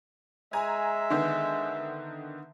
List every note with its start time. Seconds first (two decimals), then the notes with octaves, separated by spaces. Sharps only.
0.53 G#3 E5 G#5 A#5
1.10 D3 D#3 B3